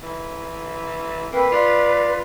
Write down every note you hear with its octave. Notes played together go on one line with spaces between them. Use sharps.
E3
A#3 C4 B4
F4 D5